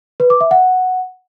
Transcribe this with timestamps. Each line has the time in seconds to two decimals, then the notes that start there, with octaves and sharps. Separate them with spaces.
0.20 B4
0.30 D6
0.41 E5
0.51 F#5